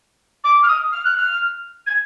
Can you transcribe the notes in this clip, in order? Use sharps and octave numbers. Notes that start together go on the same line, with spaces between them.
D6
F6
D#6
F6
F#6
F6
G#6